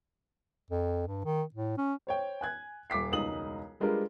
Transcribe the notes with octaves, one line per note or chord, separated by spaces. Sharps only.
F2
G2
D#3
A2
C#4
C5 C#5 G5
G#5 F#6 G#6
D#1 D6 B6 C7
E1 C#2 D#4 D#6 F#7
G3 G#3 D4 F4 A#4 B4